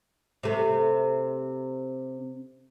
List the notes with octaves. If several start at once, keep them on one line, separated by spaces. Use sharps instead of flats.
C3 A3